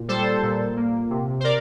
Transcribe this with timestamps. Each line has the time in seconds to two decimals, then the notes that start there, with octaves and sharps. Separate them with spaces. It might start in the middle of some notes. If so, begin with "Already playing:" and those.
Already playing: A#2
0.08 G3 A4 C5
0.42 A#2
0.76 A#3
1.10 C3
1.40 C5
1.44 A#4 D5